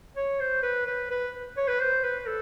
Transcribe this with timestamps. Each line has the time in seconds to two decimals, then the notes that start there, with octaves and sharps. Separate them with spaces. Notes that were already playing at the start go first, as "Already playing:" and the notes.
0.16 C#5
0.40 C5
0.63 B4
0.86 B4
1.10 B4
1.57 C#5
1.68 B4
1.80 C5
2.04 B4
2.26 A4